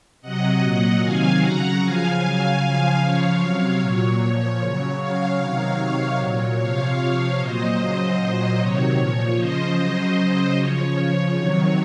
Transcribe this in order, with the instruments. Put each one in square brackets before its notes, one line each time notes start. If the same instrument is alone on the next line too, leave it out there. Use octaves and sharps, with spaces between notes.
[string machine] C3 F#3 D#5 F#5
A#2 F#3
C3 D#3 F#3 F5 G#5
C#3 F#3 F#5 A#5
C#3 F3 F5 G#5
C#3 F#3
C#3 F3
C#3 F3 C#5 F5
C3 F#3 C#5 F5
A#2 F#3 C#5
A#2 F3 C#5
C#3 F#3
C#3 F#3 C#5 F5
C3 D#3 F#3
C3 D#3 F#3
A#2 F#3 C#5
C3 F3 C#5 F5
C3 F3
A#2 F#3 C5 D#5
C#3 F#3 C5 D#5
A#2 F#3
C3 D#3 F#3 C#5
A#2 F3 C#5
C#3 F3 C5 D#5
C#3 F#3
C#3 F#3
C#3 F3 C#5
C#3 F3
C3 D#3 F#3